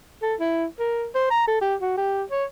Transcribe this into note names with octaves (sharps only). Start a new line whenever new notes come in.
A4
E4
A#4
C5
A#5
A4
G4
F#4
G4
C#5